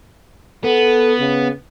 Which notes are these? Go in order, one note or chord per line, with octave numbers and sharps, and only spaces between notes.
B3 A4
C#3